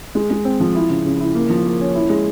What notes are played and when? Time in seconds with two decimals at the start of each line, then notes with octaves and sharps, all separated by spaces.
0.15 G#3
0.30 G#3
0.45 C4
0.60 F3
0.75 E4
0.90 C#3
1.05 C#3
1.20 E4
1.35 A#3
1.50 F3
1.65 A#3
1.80 C#4
1.95 E4
2.09 G#3